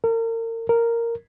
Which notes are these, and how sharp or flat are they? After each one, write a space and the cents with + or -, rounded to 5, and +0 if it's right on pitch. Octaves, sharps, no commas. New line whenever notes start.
A#4 -35
A#4 -5